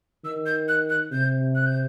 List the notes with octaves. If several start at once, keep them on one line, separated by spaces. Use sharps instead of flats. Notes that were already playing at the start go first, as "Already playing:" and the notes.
D#3 E6
G6
F#6
F#6
C3 G6
F#6
G6